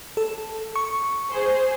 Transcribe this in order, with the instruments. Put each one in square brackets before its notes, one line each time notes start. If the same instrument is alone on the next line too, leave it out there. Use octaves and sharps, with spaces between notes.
[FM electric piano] A4
C#6
[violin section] G#4 C5